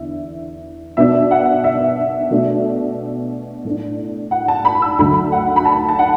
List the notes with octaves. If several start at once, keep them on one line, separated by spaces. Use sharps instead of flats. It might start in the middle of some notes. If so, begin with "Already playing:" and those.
Already playing: E2 D3 D4 E5
B2 B3 D4 E5
F#5
E5
B2 A3 D4
A2 A3 D4
F#5
A5
B5
E6
D2 D3 F#3 B5
F#5
B5
A5
A5
F#5